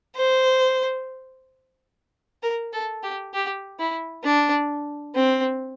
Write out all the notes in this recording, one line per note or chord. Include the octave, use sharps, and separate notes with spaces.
C5
A#4
A4
G4
G4
E4
D4
C4